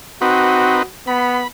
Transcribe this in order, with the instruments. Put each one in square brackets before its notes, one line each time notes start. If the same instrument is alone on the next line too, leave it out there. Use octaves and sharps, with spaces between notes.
[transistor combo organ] C4 D#4 B4 [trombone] F#4
[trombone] B3 [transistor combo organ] B5